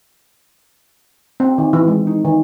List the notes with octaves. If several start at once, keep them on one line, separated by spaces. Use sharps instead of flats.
C4
D#3
E3
G#3
D#4
D#3